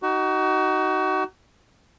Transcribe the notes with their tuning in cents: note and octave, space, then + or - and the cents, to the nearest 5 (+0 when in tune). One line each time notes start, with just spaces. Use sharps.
D#4 +0 F#4 +30